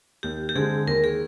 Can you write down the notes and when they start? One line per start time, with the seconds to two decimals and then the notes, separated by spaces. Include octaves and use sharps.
0.23 D#2 G4
0.49 G4
0.55 D3 G#3 C4 G#4
0.87 D#2 A#4
1.04 G#4